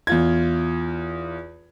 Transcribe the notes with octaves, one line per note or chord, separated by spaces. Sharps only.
E2 F4 G#6